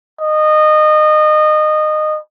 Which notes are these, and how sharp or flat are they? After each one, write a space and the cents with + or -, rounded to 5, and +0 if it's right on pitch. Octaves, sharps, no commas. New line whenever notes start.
D#5 -25